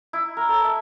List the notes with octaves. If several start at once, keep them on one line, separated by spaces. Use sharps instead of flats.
E4
A#4
A4
E5